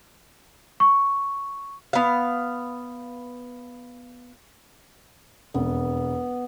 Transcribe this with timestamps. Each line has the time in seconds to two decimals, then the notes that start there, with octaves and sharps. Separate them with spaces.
0.80 C#6
1.93 B3 F5
5.54 E1 F2 B3